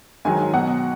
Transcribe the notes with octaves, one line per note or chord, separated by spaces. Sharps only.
G#2 D#3 F#3 G#5
B2 F#3 F#5